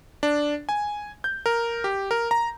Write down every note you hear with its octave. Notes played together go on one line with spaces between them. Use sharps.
D4
G#5
G6
A#4
G4
A#4
A#5